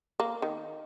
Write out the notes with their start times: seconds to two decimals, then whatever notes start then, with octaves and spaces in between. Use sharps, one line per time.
0.20 A#3
0.42 D#3